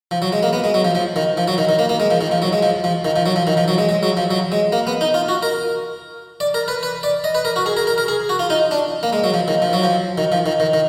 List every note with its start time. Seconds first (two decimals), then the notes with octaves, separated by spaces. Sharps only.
0.11 F3
0.22 F#3
0.32 G#3
0.43 A#3
0.53 B3
0.64 G#3
0.74 F#3
0.85 F3
0.95 F3
1.16 D#3
1.37 F3
1.48 F#3
1.58 D#3
1.69 D#3
1.79 A#3
1.89 A#3
2.00 G#3
2.11 F3
2.21 D#3
2.31 F3
2.42 F#3
2.53 G#3
2.63 F3
2.84 F3
3.05 D#3
3.16 F3
3.26 F#3
3.36 F3
3.47 D#3
3.57 F3
3.68 F#3
3.78 G#3
3.89 G#3
4.03 F#3
4.17 F3
4.31 F#3
4.52 G#3
4.72 A#3
4.87 B3
5.01 D#4
5.14 F4
5.29 F#4
5.43 A#4
6.40 D5
6.54 A#4
6.68 B4
6.83 B4
7.03 D5
7.24 D#5
7.35 B4
7.45 A#4
7.56 F#4
7.66 G#4
7.77 A#4
7.87 A#4
7.98 A#4
8.08 G#4
8.29 F#4
8.39 F4
8.50 D#4
8.71 D4
9.03 A#3
9.13 G#3
9.24 F#3
9.34 F3
9.48 D#3
9.62 F3
9.73 F#3
9.83 F3
10.18 D#3
10.32 F3
10.46 D#3
10.60 D#3
10.74 D#3